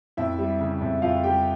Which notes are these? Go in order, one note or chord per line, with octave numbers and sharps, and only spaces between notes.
F2 E4 E5
G3
C#3
F2
F2 F4 F5
G3 G4 G5